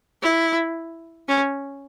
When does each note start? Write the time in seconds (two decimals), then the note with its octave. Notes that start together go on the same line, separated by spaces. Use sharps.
0.22 E4
1.28 C#4